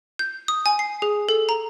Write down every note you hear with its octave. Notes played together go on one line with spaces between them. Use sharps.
G6
D#6
G#5
C7
G#4
A4
A#5